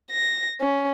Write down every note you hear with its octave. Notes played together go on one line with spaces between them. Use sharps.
A#6
C#4